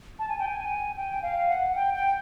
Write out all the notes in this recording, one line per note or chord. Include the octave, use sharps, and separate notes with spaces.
A5
G#5
G5
G#5
G5
F5
F#5
G5
G5